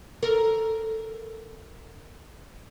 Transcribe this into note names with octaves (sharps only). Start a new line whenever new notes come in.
A4 A#4